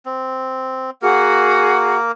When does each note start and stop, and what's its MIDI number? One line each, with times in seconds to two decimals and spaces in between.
0.06 0.90 60
1.02 2.12 58
1.02 1.97 66
1.02 1.97 68
1.02 2.12 70
1.02 1.97 78